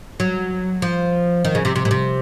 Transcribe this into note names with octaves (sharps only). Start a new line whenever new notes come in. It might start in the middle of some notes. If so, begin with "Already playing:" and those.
F#3
F3
D#3
C#3
C3
C3
A#2
C3